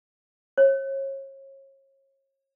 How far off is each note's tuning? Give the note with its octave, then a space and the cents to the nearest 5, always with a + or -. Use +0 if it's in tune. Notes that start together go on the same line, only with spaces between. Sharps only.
C#5 -35